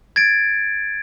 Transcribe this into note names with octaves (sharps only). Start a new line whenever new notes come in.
G#6 A6 D7